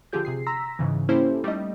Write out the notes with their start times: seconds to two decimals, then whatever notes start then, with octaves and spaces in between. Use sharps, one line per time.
0.13 D3 F3 F4 G4 G#4 G6
0.25 C3 G#4 C7
0.46 A#5 C6 E6 A#6 B6
0.79 G#2 C#3 E3
1.09 A#3 C#4 E4 G4 A4 C5
1.44 G3 A3 D#4 D#5